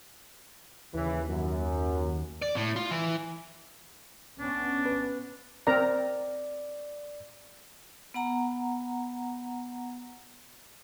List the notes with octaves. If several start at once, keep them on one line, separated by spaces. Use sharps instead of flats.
D#2 C#3 E3
F#2
D5
A2
F4
E3
B3 C#4 D4
B4
C4 A#4 D5 A#5
B3 F#5 A#5